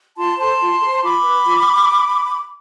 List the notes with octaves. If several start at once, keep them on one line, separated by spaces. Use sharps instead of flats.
F4 A5 C6
A4 C5 A5 C6
F4
A4
C5
F4 B5 D6
B4
F4